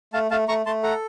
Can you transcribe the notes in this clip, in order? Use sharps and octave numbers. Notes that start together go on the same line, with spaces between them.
A3 F5 A5
A3 F5 A5
A3 A#5 C#6
A3 A5 C6
A4 F#5 A#5